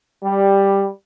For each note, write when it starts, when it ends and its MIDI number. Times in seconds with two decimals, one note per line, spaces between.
0.23 0.88 55